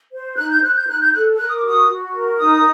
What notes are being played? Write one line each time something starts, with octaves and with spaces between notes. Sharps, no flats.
C5
D#4 F#6
G6
C5 F#6
G6
D#4 F#6
G6
A4 F#6
A#4 F#6
D#6
D6
F#4 D#6
F#4
A#4
D#4 D#6